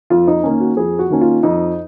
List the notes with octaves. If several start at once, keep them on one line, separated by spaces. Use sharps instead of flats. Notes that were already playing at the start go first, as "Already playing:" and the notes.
F2 F4
D#4
D#3 A#3 C#4
F#4
F2 G#4
F#4
D#3 A#3 C#4
F4
F2 D#4